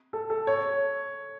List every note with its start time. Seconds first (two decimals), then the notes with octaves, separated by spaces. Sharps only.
0.13 A4
0.30 A4
0.47 C#5